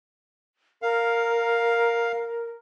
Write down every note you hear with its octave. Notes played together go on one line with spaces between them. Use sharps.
A#4 F5